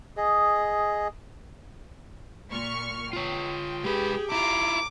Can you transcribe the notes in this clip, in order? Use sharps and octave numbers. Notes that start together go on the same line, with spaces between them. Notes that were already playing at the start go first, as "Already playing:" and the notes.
G#4 D#5
A#2 C#6 F6
F4 C#5 G5
G#3 G4 G#4 B4
E4 F4 A#5 D6